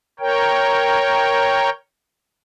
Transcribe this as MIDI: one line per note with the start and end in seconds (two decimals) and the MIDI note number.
0.20 1.70 70
0.20 1.70 73
0.20 1.70 79